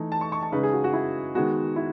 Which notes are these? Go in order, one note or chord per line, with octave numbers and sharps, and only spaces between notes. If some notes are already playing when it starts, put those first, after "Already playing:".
Already playing: E3 A3 D#4
A5
C#6
C#6
A5
C#3 G#3 D#4 B4
G#4
F#4
F#4
E4
D#3 G#3 B3 F#4
E4